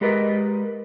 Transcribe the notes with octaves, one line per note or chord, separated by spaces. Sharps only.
G#3 G4 A#4 B4 D5 D#5